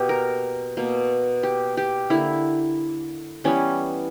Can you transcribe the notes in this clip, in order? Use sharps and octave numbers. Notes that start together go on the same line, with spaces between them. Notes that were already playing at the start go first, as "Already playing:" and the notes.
Already playing: B2 A#3 G4
A#4
B2 A#3
G4
G4
D3 A#3 E4
E3 G3 B3 C#4